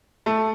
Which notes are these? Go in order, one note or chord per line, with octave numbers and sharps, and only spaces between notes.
A3